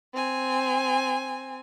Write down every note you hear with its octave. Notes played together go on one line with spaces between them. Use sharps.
C4 G#5